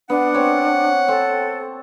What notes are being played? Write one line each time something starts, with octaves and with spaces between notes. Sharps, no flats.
B3 D4 F#5
C4 C#5
C4 A4